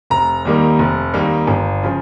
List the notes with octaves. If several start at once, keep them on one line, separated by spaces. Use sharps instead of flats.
F1 A#5
D#2 D#3 G3 A#3
F1
D#2 D#3 G3 A#3
G1
C#3 F3